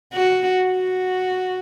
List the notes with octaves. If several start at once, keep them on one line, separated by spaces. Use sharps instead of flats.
F#4
F#4